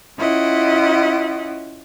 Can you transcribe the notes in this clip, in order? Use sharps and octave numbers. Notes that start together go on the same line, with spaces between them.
C#4 E4 F4 D#5 F#5